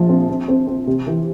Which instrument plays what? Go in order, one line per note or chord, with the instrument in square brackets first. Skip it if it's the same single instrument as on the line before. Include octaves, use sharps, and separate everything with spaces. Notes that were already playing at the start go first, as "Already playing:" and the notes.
Already playing: [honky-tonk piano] A#1 F3
C4
C4
C4
C4
C3
E3